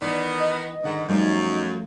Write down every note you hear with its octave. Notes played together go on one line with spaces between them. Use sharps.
D#3 E3 B3 D5
D#5
G#2 D3 D#3 F#5
F#2 F3 G3 A3 D#4